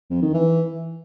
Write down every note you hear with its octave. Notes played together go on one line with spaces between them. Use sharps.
F2
D#3
E3